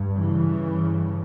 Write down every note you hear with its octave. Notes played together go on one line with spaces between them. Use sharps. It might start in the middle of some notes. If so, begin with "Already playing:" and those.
Already playing: G2
C#3 E3
G2